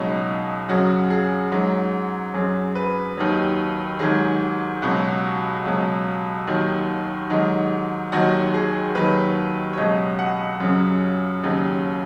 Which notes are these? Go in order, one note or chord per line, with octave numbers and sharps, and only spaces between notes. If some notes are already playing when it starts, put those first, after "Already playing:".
Already playing: C#2 B2 F#3 D#4
F#2 C#3 F#3 F#4
G#4
G#2 F#3
F#2 F#3 G#4
B4
D#2 D#3 F#3
G#2 D#3 F#3 G#4
C#2 B2 F#3 F#4
C#2 B2 F#3
D#2 D#3 F#3 F#4
G#2 D#3 F#3 D#4
D#2 D#3 F#3 F#4
G#4
D#2 D#3 F#3 B4
C#5
C#2 B2 F#3 D#5
F#5
F#2 C#3 F#3
D#2 C#3 F#3